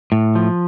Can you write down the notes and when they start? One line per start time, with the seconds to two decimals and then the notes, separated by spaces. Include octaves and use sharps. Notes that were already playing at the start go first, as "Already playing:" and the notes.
0.12 A2
0.35 F3